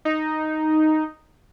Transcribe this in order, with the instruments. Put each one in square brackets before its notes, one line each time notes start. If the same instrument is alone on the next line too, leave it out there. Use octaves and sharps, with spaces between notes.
[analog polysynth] D#4